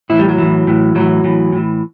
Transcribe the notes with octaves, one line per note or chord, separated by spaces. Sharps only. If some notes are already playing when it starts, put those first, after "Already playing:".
A2 E3 E4
G3
F#3
A2 E3
A2 E3
A2 E3 F#3
A2 E3
A2 E3